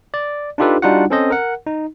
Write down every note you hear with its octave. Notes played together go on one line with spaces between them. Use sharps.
D5
D4 D#4 F4 G4 A4 B4
G3 D4 D#4 F4 F#4 F#5
C4 C#4 A4 C5 D#5
A#4 F#5
D#4